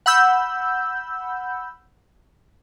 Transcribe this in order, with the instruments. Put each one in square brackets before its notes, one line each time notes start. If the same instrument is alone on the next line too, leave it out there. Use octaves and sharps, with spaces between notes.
[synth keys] F#5 B5 E6 G6